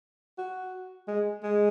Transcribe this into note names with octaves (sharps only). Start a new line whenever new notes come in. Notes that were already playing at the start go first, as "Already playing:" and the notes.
F#4
G#3
G#3